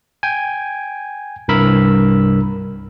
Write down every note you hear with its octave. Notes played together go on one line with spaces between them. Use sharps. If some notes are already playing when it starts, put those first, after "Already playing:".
G5 G#5
C2 G2 A#4 B5 E6